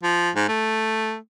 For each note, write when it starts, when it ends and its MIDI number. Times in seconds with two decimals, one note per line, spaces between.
0.03 0.30 53
0.36 0.45 44
0.48 1.17 57